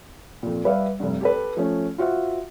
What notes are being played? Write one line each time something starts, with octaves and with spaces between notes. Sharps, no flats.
F2 A#2
G3 B4 D5 E5 F5
F1 G2
G4 A4 B4
F3 A3 C#4
F4 F#4 C5 E5 F#5